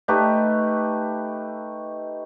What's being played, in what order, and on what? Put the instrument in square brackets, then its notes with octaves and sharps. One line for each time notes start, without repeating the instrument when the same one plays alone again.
[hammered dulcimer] A3 D#4 G4 B4